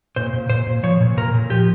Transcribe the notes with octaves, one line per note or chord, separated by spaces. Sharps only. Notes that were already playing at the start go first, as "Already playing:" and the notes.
A#2 C5
A#2
A#2 C5
A#2
F3 C#5
A#2
A#2 A#4
A#2
F3 G4